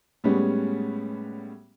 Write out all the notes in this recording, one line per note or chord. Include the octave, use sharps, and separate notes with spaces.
A2 G3 G#3 B3 C#4